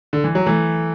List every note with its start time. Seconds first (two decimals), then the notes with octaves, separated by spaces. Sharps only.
0.13 D3
0.24 E3
0.35 F#3
0.46 E3 A3